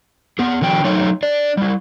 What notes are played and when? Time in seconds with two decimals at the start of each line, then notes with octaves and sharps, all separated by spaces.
0.39 B3 G#4
0.61 D3 E3 F#3 G5
0.84 F#3 A3 D#4 C#5
1.23 D4 D5
1.57 G3 E4